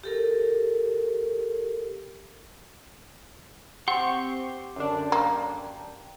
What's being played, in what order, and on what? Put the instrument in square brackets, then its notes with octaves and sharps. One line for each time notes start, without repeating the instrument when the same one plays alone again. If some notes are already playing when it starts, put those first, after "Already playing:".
[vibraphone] G4 A4 A#4
[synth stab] C4 [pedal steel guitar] G4 C6 C#6 [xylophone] F#5
[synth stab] F#2 D3 D4
[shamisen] A#3